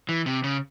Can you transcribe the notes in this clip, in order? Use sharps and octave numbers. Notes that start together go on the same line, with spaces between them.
E3
C3
C#3